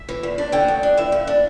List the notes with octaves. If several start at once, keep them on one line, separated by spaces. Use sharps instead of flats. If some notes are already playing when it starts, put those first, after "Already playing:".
Already playing: E5
E3
E2
D4
D3 G5
D2
D4
E3 E5
G2
D4